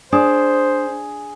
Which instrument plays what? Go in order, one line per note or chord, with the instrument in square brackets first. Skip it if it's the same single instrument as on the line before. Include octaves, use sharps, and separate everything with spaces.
[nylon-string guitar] D4 [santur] G#4 [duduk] C5